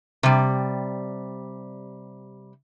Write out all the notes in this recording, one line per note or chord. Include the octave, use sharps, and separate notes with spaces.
C3 G3